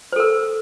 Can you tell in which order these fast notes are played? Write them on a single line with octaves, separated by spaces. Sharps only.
C5 A4 A#4